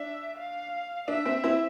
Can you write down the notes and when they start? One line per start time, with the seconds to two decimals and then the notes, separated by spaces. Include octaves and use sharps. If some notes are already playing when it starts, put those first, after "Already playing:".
Already playing: D4 E5
0.38 F5
1.08 D4 E5
1.26 C4
1.44 C4 E4